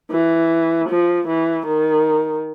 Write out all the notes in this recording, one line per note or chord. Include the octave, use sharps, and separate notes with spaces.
E3
F3
E3
D#3